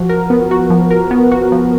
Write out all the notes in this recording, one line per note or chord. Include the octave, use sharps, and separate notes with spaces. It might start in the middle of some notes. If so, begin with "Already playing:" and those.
Already playing: F3 F#4
A#4
B3
F#4
F3
A#4
B3
F#4
F3